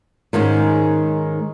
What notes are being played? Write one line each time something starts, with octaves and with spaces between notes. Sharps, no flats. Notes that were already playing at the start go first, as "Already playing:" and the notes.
G#2 D#3 G#3 C#4